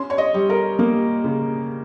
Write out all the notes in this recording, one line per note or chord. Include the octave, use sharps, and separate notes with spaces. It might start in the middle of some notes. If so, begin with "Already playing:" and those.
Already playing: C#4 C6
C#5
D#5
G3
A#4
A#3
C#3